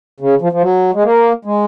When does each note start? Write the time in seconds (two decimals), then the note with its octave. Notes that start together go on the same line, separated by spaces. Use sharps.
0.20 C#3
0.42 F3
0.52 F3
0.62 F#3
0.94 G#3
1.04 A#3
1.45 G#3